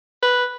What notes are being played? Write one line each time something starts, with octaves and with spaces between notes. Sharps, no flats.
B4